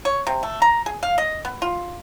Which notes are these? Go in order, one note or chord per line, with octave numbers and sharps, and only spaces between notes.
C#5
C3
A3
A#5
G#4
F5
D#5
B3
F4